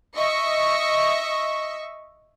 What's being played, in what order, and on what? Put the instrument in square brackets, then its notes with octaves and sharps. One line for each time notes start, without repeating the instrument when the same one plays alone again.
[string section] D#5 E5 C#6